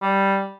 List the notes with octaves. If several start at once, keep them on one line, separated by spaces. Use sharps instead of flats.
G3